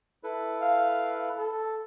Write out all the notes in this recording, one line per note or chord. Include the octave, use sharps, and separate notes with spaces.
E4 A4 B4
F5
A4